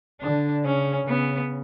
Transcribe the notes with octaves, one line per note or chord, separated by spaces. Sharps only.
D3 D4
C#3 C#4
C#3 B3